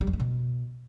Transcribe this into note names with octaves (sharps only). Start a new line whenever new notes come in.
G3
F2
A3
B2